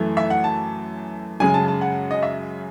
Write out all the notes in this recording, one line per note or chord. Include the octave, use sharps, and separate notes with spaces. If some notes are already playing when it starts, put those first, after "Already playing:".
Already playing: F#2 E3 A3
E5
F#5
A5
F#2 C#3 G#3 G#5
A5
A5
F#5
D#5
E5